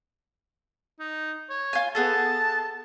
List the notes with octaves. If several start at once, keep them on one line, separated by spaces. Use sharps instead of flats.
D#4
C#5
F4 G#5
B3 G#4 A4 A5